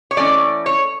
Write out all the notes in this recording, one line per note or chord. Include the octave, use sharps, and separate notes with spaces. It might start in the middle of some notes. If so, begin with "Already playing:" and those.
C#5
E3 A3 C#4 D5
C#5